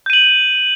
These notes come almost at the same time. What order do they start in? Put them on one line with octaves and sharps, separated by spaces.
G6 D#7 F#7